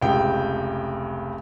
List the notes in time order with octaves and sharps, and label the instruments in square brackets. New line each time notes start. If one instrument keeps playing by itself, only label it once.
[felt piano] F1 C#2 G5